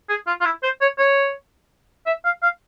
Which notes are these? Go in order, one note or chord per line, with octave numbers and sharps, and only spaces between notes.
G#4
F4
F4
E4
C5
C#5
C#5
E5
F5
F5